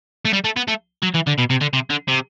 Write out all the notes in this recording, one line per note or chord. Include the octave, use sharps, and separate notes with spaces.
A3
G3
A3
B3
A3
F#3
E3
D3
B2
C3
D3
C3
D3
C3